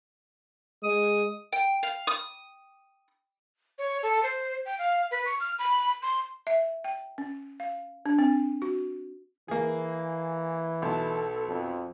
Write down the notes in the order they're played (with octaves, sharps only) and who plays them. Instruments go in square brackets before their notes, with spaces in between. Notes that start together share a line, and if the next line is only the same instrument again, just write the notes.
[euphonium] G#3 [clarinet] D#6
[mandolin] G5
F5
D#6
[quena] C#5
A4
C5
G5
F5
B4
C#6
F6
B5
C6
[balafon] E5
G5
C#4
F5
D4
C4
F#4
[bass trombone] E3 [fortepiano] A#3 G#4
[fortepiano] B1 A5 [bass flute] A4
[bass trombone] F2